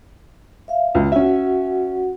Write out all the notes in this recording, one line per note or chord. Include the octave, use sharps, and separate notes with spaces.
E5 F5
C#2
C#4 F#4 E5 F#5